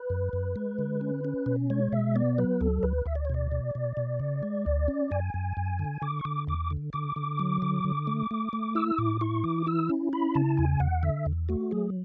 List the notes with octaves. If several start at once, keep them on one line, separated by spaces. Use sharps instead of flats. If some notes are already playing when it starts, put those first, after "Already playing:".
Already playing: B4
F#2
F#2
G#3
D3
C#4
C#4
B2
G#3 C#5
B2 E5
B3 D5
F#3 B4
D2 A4
D2 B4
D2 E5
D5
C#5
B2 D5
B2
B2
B2
C#3
G#3
D2
C#4
F#2 G#5
F#2
F#2
D3
D3 D6
C#6
D3 D6
E2 D6
D3
D3 D6
D3
F#3
D3
D3
A3
A3
A3
E4 E6
A2 D6
E4 C#6
E3 D6
E4 E6
C#4
E4 B5
C#3 A5
E2 G#5
E2 F#5
D3 E5
E2
A3 F#4
F#3 G#4